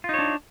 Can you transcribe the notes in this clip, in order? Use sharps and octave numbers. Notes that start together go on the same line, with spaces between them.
D4 D#4 F4 C#5